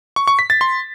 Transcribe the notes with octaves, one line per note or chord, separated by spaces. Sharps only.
C#6
C#6
B6
A6
C6